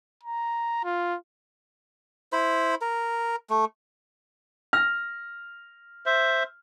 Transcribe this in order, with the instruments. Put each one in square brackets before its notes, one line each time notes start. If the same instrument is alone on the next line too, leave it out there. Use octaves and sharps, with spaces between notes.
[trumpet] A#5
F4
[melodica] E4 C5 B5
A#4
A3
[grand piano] F6 A#6
[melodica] C5 E5